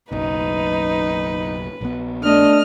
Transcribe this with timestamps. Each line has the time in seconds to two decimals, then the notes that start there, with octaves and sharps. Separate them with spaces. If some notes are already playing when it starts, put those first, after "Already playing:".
0.12 F#1 B1 D#4 B4
1.81 A#1 B3
2.24 A3 D4 D#5 F6